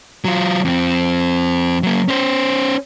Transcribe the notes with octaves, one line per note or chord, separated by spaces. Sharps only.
F#3 F4
F2 C4
F#3 A#3
C#4 C5